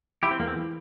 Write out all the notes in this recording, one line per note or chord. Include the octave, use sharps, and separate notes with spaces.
E3 E4 G4
C4
E2 A#3
C4
E3